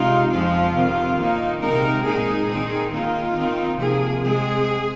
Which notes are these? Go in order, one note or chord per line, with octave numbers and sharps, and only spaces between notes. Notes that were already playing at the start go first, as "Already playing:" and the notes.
Already playing: C3 G#3 D#4 F4
F2 F3 G#3 C4 F4
F2 C3 D#3
A#2 A#3 D#4
C3 D#3 G#3 C4 D#4 A#4
A#2 G#3 D#4 G#4
D#3 C4 D#4
D#3 A#3 D#4 F4
D#3 C4 D#4
C3 F3 A#3 G#4
C3 G#3 C4 G#4